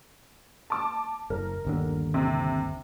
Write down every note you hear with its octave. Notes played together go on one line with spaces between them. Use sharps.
A5 D6
F#1 A#4
G1 D#2 D3
C3